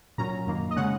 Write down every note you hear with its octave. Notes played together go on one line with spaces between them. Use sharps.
A#2 F#3 C#4 A#5
F#2 D#3 A#3
D#5
C#3 G#3 C#4 F#5